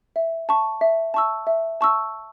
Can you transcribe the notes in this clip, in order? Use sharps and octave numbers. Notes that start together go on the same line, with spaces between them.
E5
A5 C#6
E5
A5 C#6 E6
E5
A5 C#6 E6